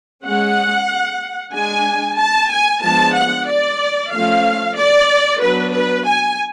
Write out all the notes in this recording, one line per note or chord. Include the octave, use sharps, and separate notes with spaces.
G#3 C#4 F#5
G#3 D4 G#5
A5
G#5
F3 G#3 B3 D4 A5
F#5
D5
F3 A3 C#4 F5
D5
F#3 B3 D4 B4
B4
G#5